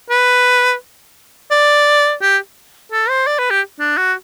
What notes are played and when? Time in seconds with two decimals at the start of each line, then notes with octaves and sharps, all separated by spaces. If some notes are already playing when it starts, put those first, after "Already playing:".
0.10 B4
1.51 D5
2.22 G4
2.92 A4
3.09 C5
3.27 D5
3.39 B4
3.50 G4
3.80 D4
3.97 F#4